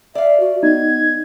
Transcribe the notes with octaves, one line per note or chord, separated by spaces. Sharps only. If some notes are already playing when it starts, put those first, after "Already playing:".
D5 E5 F5
F#4
B3 D#4 G#6